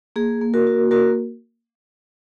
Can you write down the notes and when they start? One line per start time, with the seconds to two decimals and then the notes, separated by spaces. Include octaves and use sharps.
0.16 A#3 G#4
0.41 A#3
0.54 F#4 A#4
0.67 F#4
0.91 A#3 F#4 A#4